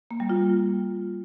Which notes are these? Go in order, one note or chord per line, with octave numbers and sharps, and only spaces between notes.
A#3
G3
F4